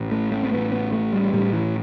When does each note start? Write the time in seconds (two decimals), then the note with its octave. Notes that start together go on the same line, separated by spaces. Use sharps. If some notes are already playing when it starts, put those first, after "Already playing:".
Already playing: A1 A2
0.11 A3
0.31 A3
0.43 C4
0.52 A1 A2 B3
0.72 B3
0.92 A3
1.13 G3
1.33 A1 A2 G3
1.53 E3